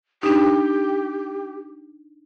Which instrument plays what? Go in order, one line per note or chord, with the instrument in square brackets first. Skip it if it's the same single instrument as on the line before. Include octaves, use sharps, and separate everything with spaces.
[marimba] D4 D#4 [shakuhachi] G4